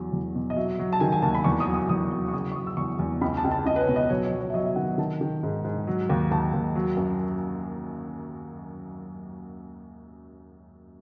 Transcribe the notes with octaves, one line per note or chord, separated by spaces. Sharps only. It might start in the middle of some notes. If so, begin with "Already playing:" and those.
Already playing: E2 F#3
E2
B2
D#5
F#3 E5
F#3
A5
D#3 G#5
G#5
D#2 A5
B5
E2 C#6
D#6
F#3
D#6
E2 D#6
F#3
C#6
C#3 D#6
C#6
F#3 D#6
E6
E2 C#6
E2
C#2 B5
A5
C#2
A5
C#2 D#5
B4
C#5
B2
D#5
F#3 C#5
C#5
F#3
C#5
E5
F#3 D#5
E5
D#3 F#5
D#3 A5
D#3
G#2
G#2
F#3
D#2
D#2 A5
D#2
F#3
F#2